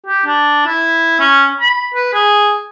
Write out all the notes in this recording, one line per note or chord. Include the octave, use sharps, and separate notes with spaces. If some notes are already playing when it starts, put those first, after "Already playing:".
G4
D4
E4
C#4
B5
B4
G#4